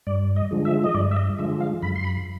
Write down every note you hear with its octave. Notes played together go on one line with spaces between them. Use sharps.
G2 D5
D#5
D3 F3 G#3
E5
D#5
G2 D5
E5
D#5
D3 F3 G#3 E5
F5
F#2 B5
C6
B5